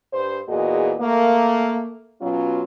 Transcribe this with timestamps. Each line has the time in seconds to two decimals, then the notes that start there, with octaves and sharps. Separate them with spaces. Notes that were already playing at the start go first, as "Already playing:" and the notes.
0.13 G2 C5
0.48 E2 A#2 F#4 G#4 D#5
1.01 A3 A#3
2.22 B2 F#3 C#4 F4